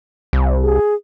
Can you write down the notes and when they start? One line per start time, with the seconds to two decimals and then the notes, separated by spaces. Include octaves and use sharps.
0.33 C2
0.63 G#4